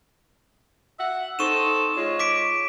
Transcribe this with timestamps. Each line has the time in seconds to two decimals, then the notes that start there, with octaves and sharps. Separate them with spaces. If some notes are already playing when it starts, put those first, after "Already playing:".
0.98 E5 F#5
1.39 C4 D#4 A4 C#6 E7
1.96 G#3 F4 C#5
2.19 D6 B6 D7